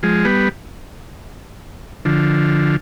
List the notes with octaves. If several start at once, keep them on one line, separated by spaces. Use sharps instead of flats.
F3 G#3
G3 B3
D3 F3